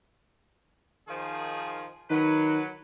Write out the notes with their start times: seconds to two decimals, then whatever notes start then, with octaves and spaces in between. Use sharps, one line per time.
1.08 D#3 F3 G#4
2.10 D#3 F#3 B4